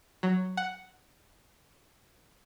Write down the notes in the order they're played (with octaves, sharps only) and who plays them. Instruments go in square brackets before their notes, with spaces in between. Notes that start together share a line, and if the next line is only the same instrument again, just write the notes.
[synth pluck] F#3
F#5